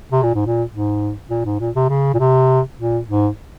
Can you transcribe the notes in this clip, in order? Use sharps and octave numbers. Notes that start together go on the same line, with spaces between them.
C3
A#2
G#2
A#2
G#2
A#2
G#2
A#2
C3
C#3
A#2
C3
A#2
G#2